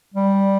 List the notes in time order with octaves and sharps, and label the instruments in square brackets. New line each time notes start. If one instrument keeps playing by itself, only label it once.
[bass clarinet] G3